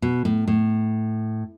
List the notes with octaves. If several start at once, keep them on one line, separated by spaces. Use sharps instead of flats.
B2
A2
A2